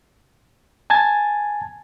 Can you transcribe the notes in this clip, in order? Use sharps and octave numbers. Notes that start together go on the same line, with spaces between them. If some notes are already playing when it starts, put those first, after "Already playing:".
G#5 A5 G#6 A6